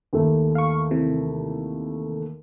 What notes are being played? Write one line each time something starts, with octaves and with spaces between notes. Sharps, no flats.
D#2 A3
F5 C#6
C3 E3